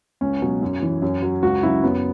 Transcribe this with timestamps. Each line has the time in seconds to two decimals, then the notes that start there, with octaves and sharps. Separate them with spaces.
0.21 C#2 C#4
0.42 B2 F#3
0.62 F#2
0.82 E3
1.02 F#2
1.22 F#3
1.43 C#2 F#4
1.63 C#3 F#3 E4
1.83 F#2 B3